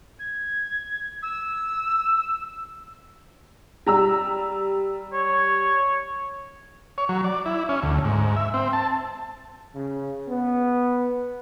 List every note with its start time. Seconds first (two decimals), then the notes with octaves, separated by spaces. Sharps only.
0.19 G#6
1.22 E6
3.87 G3 A#5 E6
5.13 C#5
6.98 C#5
7.09 F#3
7.24 D5
7.46 E4
7.69 C#4
7.82 D2
8.04 G#2
8.36 E5
8.54 C4
8.73 A5
9.75 C#3
10.28 B3